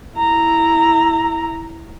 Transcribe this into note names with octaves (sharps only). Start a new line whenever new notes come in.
E4 A#5